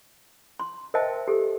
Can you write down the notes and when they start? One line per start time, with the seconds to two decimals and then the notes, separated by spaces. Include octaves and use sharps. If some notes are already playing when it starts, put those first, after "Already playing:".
0.60 C6
0.94 A#4 C5 D#5 E5 G5 A5
1.28 G4 A4